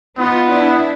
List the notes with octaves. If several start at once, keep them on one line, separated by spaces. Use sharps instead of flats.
B3 D#4 F4
D4 E4